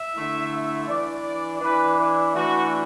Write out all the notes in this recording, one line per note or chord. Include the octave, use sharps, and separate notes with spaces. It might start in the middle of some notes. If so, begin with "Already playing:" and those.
Already playing: E5
D3 A3 E4
E5
E3 D4 D5
E3 D4 B4
E4
E3 A3 D4 F#4